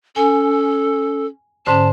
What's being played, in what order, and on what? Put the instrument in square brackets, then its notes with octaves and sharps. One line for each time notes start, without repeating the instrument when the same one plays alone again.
[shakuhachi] C#4 [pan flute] A4 [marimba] G#5
[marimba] G#2 D3 C5 [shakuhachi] C#4 [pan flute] A5